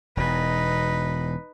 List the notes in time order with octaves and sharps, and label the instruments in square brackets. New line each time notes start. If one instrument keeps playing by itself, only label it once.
[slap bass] E1 B2 [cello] D#4 B4